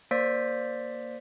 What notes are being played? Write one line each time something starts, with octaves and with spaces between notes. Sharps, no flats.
A#3 C5 D5 B6